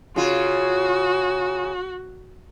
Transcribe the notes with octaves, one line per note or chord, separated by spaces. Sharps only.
C#3 F4 F#4